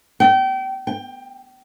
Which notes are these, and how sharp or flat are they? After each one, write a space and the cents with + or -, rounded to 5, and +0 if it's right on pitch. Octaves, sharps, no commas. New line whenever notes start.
G5 -30
G5 +20